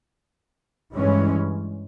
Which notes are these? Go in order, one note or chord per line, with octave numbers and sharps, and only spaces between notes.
G2 E3 G#3 C#4